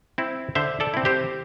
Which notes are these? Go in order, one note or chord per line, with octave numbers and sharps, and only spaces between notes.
C4 E4
D3 C5 E5
A4 D5
C4 E4
G4 C5